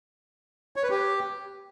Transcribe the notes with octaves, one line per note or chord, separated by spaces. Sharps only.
C#5
B4
G4